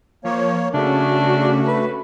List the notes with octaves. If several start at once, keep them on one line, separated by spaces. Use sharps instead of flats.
F3 A#3 C#5
C#3 A3 C#4 D4 F#4
B4